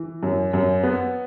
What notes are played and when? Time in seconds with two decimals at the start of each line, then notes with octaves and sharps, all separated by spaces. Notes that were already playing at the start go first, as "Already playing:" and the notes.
Already playing: E3
0.23 F#2
0.53 F#2
0.83 B3